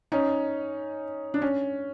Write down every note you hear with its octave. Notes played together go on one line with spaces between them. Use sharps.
C#4 D#4
D4
C#4